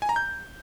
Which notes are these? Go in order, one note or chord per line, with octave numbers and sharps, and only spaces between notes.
G#5
A#5
G6